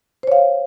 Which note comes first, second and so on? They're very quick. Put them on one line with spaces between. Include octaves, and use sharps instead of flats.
C5 C#5 F5